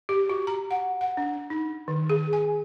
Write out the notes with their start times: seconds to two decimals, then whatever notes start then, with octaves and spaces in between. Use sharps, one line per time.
0.09 G4
0.29 F#4
0.47 A#5
0.71 F#5
1.01 F#5
1.17 D4
1.50 D#4
1.88 D#3
2.10 G#4
2.33 G#5